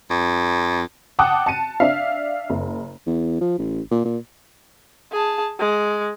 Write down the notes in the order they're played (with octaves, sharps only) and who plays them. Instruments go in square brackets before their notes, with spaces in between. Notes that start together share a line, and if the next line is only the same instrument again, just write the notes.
[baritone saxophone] F2
[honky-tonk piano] F#5 G5 A5 D6 D#6 F#6
A5 C#7 D#7
D4 E5 F5
F#1
[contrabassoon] E2
F3
A1
A#2
A#2
[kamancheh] G#4 A5
G#3